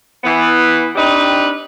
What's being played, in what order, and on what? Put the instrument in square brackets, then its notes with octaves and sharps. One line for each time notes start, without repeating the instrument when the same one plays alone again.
[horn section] E3 B3
C4 D4 D#4 G4 B4